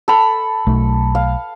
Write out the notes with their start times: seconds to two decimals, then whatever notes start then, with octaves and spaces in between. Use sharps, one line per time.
0.08 A4 B5
0.67 B1 A3
1.15 F5